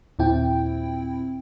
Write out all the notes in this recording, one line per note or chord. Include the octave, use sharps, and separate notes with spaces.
D#2 A#2 C4 E4 G5